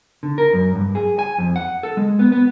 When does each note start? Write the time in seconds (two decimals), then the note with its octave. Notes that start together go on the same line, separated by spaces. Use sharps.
0.23 D3
0.38 A#4
0.53 F#2
0.75 G2
0.95 G#4
1.19 G#5
1.38 F2
1.56 F#5
1.83 A4
1.97 G#3
2.19 B3
2.32 B3